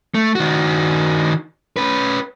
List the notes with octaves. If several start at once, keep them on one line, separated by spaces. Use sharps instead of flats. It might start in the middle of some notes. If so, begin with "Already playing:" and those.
A3
D#3 F#4
C#4 B4